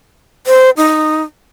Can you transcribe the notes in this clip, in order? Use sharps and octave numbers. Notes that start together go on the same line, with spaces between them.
C5
D#4